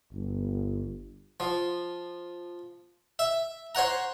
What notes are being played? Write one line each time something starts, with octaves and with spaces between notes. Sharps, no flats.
G1
F3
E5
C5 C#5 F#5 A#5